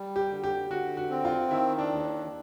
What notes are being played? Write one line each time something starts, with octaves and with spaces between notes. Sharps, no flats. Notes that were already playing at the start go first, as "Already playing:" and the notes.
Already playing: G3
G4
D3
G4
D3 F#4
F#4
C4
F4
D#3 E4
D4
D#2